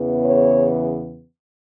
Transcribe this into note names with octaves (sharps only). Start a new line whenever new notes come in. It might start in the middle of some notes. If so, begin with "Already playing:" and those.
Already playing: E2 C#3 E3 B3
C#5